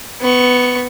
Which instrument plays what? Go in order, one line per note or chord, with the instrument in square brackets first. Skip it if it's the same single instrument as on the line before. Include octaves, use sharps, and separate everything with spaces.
[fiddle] B3 C#6